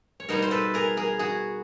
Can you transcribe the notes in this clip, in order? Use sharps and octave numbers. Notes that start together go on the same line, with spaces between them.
C#5
B2 G3 B3 D#4 A#4 C5
C5
A4 B4
G#4 A#4
G#4 A#4
F#4 G#4